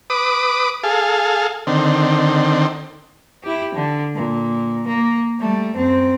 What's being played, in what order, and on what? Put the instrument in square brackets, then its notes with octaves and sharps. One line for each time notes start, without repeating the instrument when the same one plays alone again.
[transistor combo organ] B4 D6 D#6
G#4 A4 F5
D3 D#3 C4
[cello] E4 G4
D3
A#2
A#3
G3 A3
F#2 C4